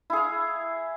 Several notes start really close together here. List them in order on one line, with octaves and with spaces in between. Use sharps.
E4 G#4 F5